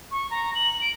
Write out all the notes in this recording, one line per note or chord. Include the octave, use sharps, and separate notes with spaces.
C#6
A#5
F#7
D7